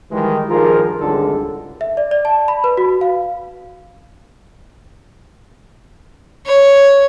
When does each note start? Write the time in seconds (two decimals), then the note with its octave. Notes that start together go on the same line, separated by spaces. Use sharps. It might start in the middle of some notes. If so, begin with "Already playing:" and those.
0.11 D#3 E3 G3 G#3
0.49 G2 D#3 F3 F4 G#4 A#4
1.00 G#1 C#2 G2 D3 G#3 A4
1.81 E5
1.97 D5
2.11 D5
2.25 A5
2.48 B5
2.64 B4
2.77 F#4
3.01 F5
6.46 C#5